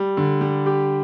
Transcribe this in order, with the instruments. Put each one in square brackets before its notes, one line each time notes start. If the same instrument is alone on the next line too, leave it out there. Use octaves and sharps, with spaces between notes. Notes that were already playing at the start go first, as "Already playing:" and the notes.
Already playing: [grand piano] G3
D3
G3
G4